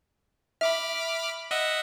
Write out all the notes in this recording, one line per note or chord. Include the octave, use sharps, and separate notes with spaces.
E5 B5 D6 F6
D#5 E5 F#5